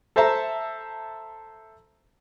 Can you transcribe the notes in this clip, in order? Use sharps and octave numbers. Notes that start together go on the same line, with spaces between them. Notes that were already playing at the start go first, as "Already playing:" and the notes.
A4 C5 E5 A5 A#5